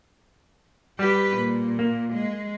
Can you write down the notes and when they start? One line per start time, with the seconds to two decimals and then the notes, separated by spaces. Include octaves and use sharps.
0.99 G3 G4 B4
1.37 A#2
1.79 A#3
2.13 G#3